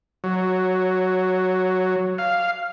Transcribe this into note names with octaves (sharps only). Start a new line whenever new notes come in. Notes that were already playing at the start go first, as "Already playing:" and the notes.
F#3
F5